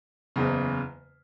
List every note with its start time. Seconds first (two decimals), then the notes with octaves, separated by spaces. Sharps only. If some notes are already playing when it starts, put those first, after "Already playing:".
0.36 F#1 E2 C#3